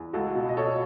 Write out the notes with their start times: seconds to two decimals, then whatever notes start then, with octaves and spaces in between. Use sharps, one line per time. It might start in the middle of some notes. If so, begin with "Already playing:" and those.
Already playing: E2
0.13 C#2 F#4 A4
0.35 B2
0.49 D#5
0.57 B2 A4 C#5